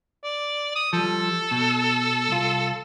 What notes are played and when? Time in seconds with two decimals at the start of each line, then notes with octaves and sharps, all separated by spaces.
0.23 D5
0.75 D#6
0.93 F3 G3 A4
1.51 B2
2.29 C2 F4